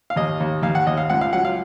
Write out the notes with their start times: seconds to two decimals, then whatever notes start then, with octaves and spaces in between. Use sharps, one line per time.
0.10 F5
0.16 D#2 D#5
0.40 D#2
0.63 D#2 F5
0.75 F#5
0.87 D#2 D#5
0.97 F5
1.10 C#2 F#5
1.21 F5
1.33 F#3 F#5
1.45 F5